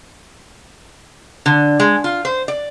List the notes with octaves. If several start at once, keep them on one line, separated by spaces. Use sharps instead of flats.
D3
G#3
F4
C5
D5